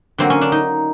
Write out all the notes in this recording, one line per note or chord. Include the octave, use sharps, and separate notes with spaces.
D3 F#3 A#3 C4
C#4
D4
D#4